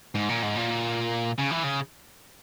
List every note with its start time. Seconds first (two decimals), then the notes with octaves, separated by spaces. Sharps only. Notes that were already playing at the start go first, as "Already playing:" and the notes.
0.15 G#2
0.29 A#2
0.43 G#2
0.56 A#2
1.39 C#3
1.51 E3
1.64 C#3